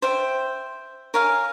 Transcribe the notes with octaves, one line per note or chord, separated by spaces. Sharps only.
C5 E5 G5
A#4 C#5 F5 G#5